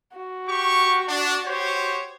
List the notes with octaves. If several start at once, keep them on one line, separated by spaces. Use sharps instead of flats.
F#4
G4 C#6
D4
G4 C5 C#5